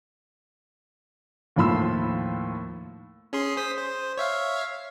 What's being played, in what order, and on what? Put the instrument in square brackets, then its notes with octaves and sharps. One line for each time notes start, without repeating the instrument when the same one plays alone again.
[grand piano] D#2 A2 F3 B5 C6 E6
[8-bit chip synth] C#4 G#4 C6
C5 D#6 B6
C5
C#5 E5 F5